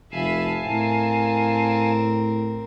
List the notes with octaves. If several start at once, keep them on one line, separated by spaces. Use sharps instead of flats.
F1 E5 F5 G#5 A5 B5
A2 C4 A#4